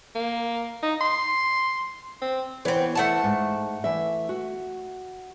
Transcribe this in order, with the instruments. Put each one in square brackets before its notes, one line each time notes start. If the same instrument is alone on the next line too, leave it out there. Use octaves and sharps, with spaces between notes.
[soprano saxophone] A#3
D#4
C6
C4
[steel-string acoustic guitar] E3 B4 C#5 [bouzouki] B3 C4
[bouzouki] A3 F#5 A5
[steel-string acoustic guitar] G#2
E3 E5
F#4